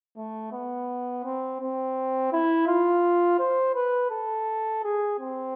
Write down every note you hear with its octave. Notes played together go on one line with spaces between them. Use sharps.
A3
B3
C4
C4
E4
F4
C5
B4
A4
G#4
C4